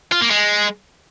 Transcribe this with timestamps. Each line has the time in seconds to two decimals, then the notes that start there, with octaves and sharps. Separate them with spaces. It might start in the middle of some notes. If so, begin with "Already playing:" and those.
0.12 F4
0.21 A#3
0.30 G#3